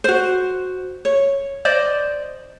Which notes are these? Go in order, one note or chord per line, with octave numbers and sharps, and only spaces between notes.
F#4 C5
C#5
C5 D5 D#5